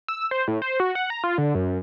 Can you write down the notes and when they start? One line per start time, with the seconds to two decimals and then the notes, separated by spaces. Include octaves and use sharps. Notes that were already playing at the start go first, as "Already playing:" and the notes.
0.08 E6
0.31 C5
0.48 A2
0.62 C5
0.80 F#4
0.95 F#5
1.10 A#5
1.24 F4
1.38 D3
1.55 F#2